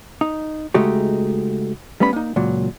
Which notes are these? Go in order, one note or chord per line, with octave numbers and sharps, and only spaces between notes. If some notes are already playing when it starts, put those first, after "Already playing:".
D#4
C#3 G#3 A3 D#4 F#4 G4
G3 A3 B3 C#4 B5
A#3 D#4
C#2 A#2 F#3